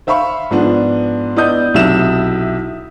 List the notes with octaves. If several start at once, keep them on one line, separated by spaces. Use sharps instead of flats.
C5 E5 F5 B5 C#6
G#2 F3 B3 D4
B3 E4 D5 D#5 D#6 G6
B1 C3 E4 E5 E7